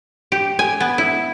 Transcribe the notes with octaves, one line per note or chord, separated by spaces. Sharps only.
G4
G#5
B3
E4